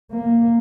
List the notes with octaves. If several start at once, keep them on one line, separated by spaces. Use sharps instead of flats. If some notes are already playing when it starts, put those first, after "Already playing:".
A#3